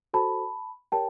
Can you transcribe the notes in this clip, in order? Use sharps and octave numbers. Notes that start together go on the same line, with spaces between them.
F#4 A4 C5 A5 B5
G4 A#4 C#5 G5 A5